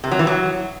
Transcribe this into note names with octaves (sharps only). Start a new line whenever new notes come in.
C3
F#3
E3
F#3